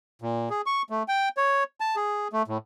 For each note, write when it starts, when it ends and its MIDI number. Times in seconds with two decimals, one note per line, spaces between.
0.22 0.49 46
0.50 0.62 68
0.66 0.82 85
0.90 1.03 57
1.08 1.29 79
1.37 1.64 73
1.80 1.96 81
1.96 2.28 68
2.33 2.42 57
2.48 2.58 45